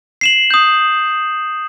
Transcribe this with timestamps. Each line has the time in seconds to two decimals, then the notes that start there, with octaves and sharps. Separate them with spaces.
0.21 C7 E7 F#7
0.51 D#6 G6